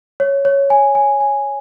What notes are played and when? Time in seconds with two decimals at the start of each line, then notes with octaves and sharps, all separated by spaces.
0.20 C#5
0.45 C#5
0.70 G#5
0.95 G#5
1.20 G#5